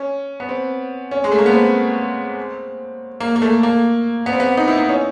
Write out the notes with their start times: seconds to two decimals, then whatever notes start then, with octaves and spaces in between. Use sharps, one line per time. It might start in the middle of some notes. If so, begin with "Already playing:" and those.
Already playing: C#4
0.40 B3
0.49 C4
1.11 C#4
1.24 G#3
1.32 A3
1.38 A#3
1.46 B3
1.53 C4
3.20 A#3
3.36 A#3
3.42 A3
3.63 A#3
4.26 B3
4.33 C4
4.40 B3
4.57 D#4
4.68 E4
4.77 D#4
4.89 C#4